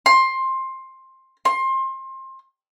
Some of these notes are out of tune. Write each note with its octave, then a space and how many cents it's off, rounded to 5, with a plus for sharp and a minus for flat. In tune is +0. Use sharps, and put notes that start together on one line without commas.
C6 +15
C6 +25